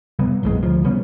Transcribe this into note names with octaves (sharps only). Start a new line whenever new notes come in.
C3 G3 B3
A#1 A2 E3 G#3
D2 F3
C3 G3 B3 C#4